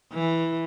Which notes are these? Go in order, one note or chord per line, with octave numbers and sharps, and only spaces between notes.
E3